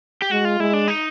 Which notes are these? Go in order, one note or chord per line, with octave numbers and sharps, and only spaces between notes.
G4
G#3 F#4
F4
G#3 E4
D4
D#4